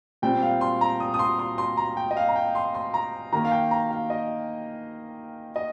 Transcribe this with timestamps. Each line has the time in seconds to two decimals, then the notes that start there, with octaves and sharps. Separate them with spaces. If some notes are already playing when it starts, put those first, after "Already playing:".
0.22 A#2 G3 C4 G5
0.42 F5
0.61 C6
0.81 A#5
1.00 D#6
1.14 D#6
1.19 C6
1.39 C6
1.58 C6
1.77 A#5
1.97 G5
2.11 D#5
2.17 F5
2.29 A#5
2.36 G5
2.55 C6
2.74 C6
2.94 A#5
3.33 D#3 A#3 A#5
3.45 F5
3.52 G5
3.71 A#5
3.91 F5
4.10 D#5
5.56 D#5